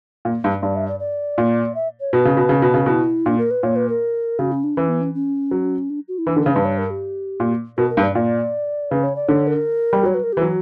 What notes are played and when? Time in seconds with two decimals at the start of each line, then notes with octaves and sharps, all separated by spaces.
0.25 A#2
0.44 G2
0.62 G2 D5
0.76 E5
0.88 D5
1.00 D5
1.38 A#2
1.75 E5
2.00 C#5
2.13 B2 B4
2.25 C#3
2.37 B2
2.49 C#3
2.62 B2
2.74 C#3
2.86 B2 E4
3.26 A#2 D4
3.38 A#4
3.51 B4
3.63 A#2 C#5
3.76 B4
3.89 A#4
4.39 C#3 F#4
4.52 C#4
4.64 D4
4.77 E3 C#4
4.89 B3
5.01 C#4
5.14 C#4
5.51 F#3
5.90 D4
6.08 F#4
6.18 E4
6.27 E3 D4
6.36 D3
6.40 A#4
6.46 C#3 C#5
6.53 G2 B4
6.65 C#5
6.78 A#4
6.90 G4
7.40 A#2
7.78 B2 A#4
7.90 A#4
7.97 G2
8.03 D5
8.15 A#2 D5
8.91 C#3 B4
9.03 C#5
9.16 D5
9.28 D3 C#5
9.47 A#4
9.93 G3
10.03 F#3 C#5
10.15 B4
10.23 A#4
10.33 G4
10.37 E3
10.41 F#3 F#4